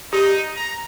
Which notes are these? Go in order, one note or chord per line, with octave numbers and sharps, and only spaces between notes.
D#4 G4
A#5